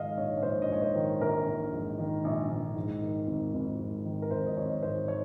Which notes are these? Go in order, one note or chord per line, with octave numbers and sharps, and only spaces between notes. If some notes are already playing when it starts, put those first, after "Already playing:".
Already playing: G#2 D#3 D#5 F5
A#1 C#5
C#5
A#1 C5
D#5
G#2 C#5
C5
D#3
A#1 A#4
A#1
G#2
D#3
A#1
A#1
G#2
D#3
G#1
G#1
G#2
D#3
A#4
G#1 C5
D#5
G#1 C#5
G#2 C5
D#3 C#5